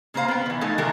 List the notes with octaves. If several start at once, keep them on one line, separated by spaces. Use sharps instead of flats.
C#3 A#3 A#4 C5 F5
B3 G5
D#3 E3
G#3 A3 D#4 A4 F5
D#3 E3 G#3 G4 A#4